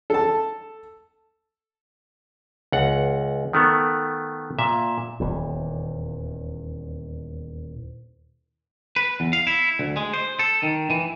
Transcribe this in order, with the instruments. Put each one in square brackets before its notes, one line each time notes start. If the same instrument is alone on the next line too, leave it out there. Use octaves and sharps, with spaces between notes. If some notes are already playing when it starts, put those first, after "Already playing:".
[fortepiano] A4 A5
[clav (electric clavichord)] C#2 F#5
D#3 A3 B3
A#2 E5
[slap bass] D#1 E2
[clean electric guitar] B4
E2
F5
E4
D2
G#3
C5
A4
D#3
E3